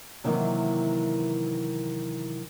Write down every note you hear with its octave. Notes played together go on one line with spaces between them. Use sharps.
C3 D#3 E3 F#3 A#3 D#4